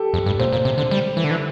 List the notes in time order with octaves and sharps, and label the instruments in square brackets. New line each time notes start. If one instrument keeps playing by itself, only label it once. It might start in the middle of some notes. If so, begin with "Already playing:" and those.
Already playing: [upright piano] G4 A4
[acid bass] F2
G2
[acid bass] A#2 [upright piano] C5
[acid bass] A#2
C3
D3
G3
E3
D3
E3